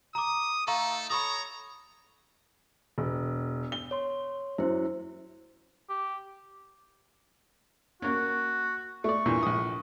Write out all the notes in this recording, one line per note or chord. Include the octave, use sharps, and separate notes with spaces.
A#5 D6 D#6
A3 D#4 A4 F5 A#5 C#6
A4 C#5 A#5 B5 C#6 D#6
E1
G7
C#5 C6
F#2 E4 C5
G4
A#3 C#4 F#4
A3 D5 C#6
E2 G2 A#2
A#1 D#6